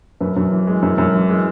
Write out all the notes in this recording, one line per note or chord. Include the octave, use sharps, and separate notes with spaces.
F#2 B4
F#2
E3
G#3
F#2
F#2
E3
G#3